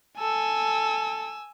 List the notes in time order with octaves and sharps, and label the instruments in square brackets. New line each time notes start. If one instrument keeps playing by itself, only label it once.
[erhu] A4 [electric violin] G#5 E6